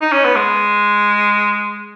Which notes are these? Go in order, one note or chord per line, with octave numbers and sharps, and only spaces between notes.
D#4
C#4
B3
G#3